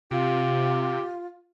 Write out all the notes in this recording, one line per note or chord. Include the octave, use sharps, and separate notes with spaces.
C3 F4 G4